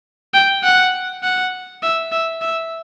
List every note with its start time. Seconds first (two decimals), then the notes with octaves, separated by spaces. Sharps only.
0.34 G5
0.64 F#5
1.23 F#5
1.83 E5
2.12 E5
2.42 E5